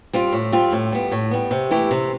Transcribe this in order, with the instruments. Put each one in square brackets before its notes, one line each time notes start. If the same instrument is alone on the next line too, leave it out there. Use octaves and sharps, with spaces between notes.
[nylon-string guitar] G3 C4 F4
A2
G3 C4 F4
A2
G3 B3
A2
G3 B3
C3
E3 A3 E4 G4
C3